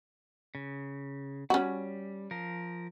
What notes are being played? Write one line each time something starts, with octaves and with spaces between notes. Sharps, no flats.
C#3
G3 C#4 F#4
F3 A#4